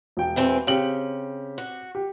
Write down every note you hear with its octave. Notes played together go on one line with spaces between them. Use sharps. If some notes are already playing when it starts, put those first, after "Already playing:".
E1 G5
E2 E3 C4
C#3 C4 G4 F#7
F#4
G4